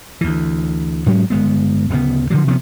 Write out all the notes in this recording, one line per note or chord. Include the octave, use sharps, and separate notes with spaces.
D2 E3
G#2 F#3 G#3 C#4
G1 G#3 B3
D1 C#3 B3
D3 F3 F#3
C3 F3 G#3 B3